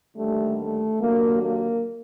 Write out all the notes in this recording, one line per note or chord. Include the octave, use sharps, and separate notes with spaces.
D#2 D3 G3 A3
A3
D#2 D3 F#3 A#3
A#3